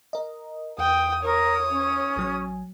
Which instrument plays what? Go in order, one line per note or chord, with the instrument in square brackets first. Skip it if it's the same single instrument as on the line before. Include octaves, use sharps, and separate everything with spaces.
[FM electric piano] A#4 D#5
[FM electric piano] E2 [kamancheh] G5 D#6
[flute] A#4 [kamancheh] C#5 D#6
[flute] C#4
[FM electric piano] A1 F#3 G#5